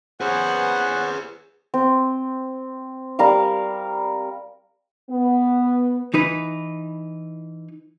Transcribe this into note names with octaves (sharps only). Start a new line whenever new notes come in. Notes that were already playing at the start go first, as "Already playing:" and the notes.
B3 C#4 G#4 B4 C5 F#5
C4
G3 A#4 F5
B3
E3 D#4 B4